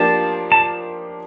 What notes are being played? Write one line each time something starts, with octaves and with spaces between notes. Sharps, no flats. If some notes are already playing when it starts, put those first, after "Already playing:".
Already playing: F3 A#3 D4 G4 A5
A5